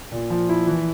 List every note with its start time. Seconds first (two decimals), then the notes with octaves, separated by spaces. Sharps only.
0.12 A#2
0.30 F3
0.49 E4
0.67 E3